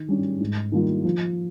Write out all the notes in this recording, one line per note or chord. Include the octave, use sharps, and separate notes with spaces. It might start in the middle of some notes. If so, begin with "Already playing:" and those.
Already playing: D#3
G3 C#4
G#2
D#3 G3 A#3 F4
F3